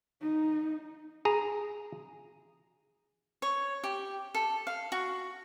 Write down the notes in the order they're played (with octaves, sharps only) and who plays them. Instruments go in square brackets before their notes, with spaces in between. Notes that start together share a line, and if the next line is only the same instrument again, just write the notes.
[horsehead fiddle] D#4
[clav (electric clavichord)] G#4 A#5
[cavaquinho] C#5
G4
A4
F5
F#4